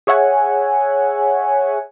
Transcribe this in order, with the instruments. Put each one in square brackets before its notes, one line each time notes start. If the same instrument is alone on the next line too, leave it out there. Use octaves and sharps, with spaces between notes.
[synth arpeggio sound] G#4 C#5 E5 F#5 G#5